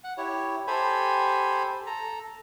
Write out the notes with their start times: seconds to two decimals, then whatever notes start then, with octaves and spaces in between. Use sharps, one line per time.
0.04 F#5
0.17 E4 G4 C#5
0.67 G4 A4 C5 G#5 B5
1.86 A4 A#5